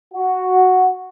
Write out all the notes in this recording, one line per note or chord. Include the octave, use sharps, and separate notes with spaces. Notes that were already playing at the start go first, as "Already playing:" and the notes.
F#4